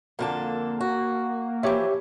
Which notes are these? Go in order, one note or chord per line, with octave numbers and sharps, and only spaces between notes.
F2 D3 A#3 A4
F#4
E3 F3 G4 C#5 E5